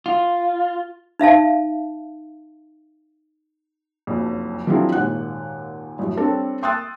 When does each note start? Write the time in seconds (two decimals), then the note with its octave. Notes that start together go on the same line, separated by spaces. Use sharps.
0.06 F4
1.19 D#4 E5 F5 A5
4.07 F#1 B1 F2
4.67 F3 F#3 C4 D4 E4 G#4
4.92 G#1 D#2 A#2 F#5 F#6
5.99 A1 F#2
6.17 G3 C4 D4 A4 C#5
6.63 G5 C6 D#6 E6 F#6 A6